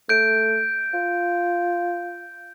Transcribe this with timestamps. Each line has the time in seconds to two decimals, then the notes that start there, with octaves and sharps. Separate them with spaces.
0.09 A3 G6 D7
0.94 F4